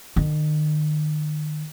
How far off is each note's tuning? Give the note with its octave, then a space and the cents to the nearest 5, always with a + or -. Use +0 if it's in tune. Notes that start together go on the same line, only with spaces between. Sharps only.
D#3 -40